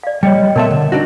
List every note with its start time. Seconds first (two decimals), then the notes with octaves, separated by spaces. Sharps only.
0.03 D5 F5
0.23 G3 C#5 D#5 G5
0.56 B2 A3 A#4 E5 A5 C6
0.71 D3
0.92 D4 D#4 F#4